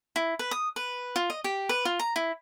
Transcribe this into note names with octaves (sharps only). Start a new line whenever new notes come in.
E4
B4
D#6
B4
F4
D#5
G4
B4
F4
A#5
E4